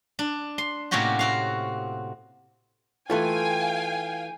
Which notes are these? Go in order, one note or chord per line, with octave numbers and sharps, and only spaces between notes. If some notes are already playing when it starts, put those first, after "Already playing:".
D4
C6
A2 C3 A#3 C#4 F#4 G4
C4 F#4 F5
E3 A3 F4 F5 G5 G#5